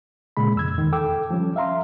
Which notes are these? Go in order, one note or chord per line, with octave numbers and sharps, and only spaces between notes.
A#2 C#3 G#3 B5
F2 E6 G#6
E2 D#3
A4 G5 D6 E6
F3 G3 C#4
E5 F5 A#5 C6